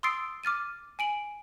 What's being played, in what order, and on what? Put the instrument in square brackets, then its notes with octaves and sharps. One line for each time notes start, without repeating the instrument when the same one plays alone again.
[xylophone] C6 D#6 E6 A6 C7 D7
D6 F6 A6 D#7
G#5 D7 F#7